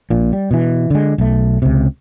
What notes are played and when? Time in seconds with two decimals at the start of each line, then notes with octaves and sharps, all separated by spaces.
0.10 A#1 A#2
0.33 G3
0.51 B2 E3
0.90 D3 G#3
1.18 B1 A3
1.62 C#2 C3